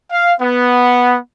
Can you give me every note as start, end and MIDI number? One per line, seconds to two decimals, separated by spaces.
0.10 0.33 77
0.41 1.18 59